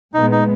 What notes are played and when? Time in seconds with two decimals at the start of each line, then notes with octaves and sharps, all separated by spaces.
0.14 A#2 G#3 B3 D#4
0.32 D#4